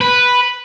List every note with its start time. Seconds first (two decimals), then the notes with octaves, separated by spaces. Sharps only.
0.01 B4